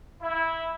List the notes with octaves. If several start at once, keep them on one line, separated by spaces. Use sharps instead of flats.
E4